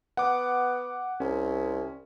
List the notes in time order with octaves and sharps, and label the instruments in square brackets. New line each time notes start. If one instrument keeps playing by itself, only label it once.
[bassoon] B3 [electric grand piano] F#5 D6
[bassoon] C2 [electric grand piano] C#4